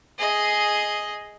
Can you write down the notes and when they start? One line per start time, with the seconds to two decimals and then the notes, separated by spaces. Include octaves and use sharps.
0.19 G#4 D#5